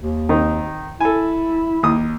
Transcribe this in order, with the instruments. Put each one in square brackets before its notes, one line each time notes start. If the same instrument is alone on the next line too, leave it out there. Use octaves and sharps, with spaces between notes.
[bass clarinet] D#2
[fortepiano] D#3 C4 D#4
[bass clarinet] E4 [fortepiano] A4 G#5
[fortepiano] D#2 D#6